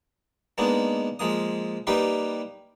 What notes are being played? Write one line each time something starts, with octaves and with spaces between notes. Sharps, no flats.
G#3 A#3 B3 D4 D#4
F3 G#3 A#3 D#6
G3 A#3 D#4 G4 B4